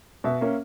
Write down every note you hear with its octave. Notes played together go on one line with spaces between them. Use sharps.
B2 E5
A#3 C#4